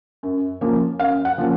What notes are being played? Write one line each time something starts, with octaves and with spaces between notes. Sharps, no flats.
F#2
F3 A#3 C#4
F#2 F5
F#5
F3 A#3 C#4